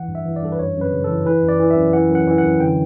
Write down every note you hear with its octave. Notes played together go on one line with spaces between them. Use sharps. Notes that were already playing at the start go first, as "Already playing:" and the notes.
Already playing: E3 F#5
G2
E5
E3
D5
G2 A4
B4
F#2 C#5
F#2 B4
C#3
A4
E3
E3 B4
F#2
D5
E3
E5
F#2
E3 F#5
F#2 F#5
E3
F#5
F#2
D3 G5